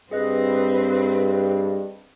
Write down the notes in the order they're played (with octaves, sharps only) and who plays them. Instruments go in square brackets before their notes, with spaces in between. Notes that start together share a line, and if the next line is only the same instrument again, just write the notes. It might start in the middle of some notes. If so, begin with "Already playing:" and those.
[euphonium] G2 [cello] C4 [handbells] G#4 D#5 F#6 [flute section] B4